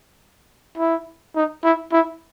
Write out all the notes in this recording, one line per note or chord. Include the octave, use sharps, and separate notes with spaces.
E4
D#4
E4
E4